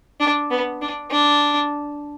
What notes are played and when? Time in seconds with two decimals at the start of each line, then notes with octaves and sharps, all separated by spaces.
0.20 D4
0.51 B3
0.81 D4
1.11 D4